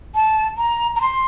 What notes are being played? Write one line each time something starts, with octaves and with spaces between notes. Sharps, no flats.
A5
A#5
A#5
C6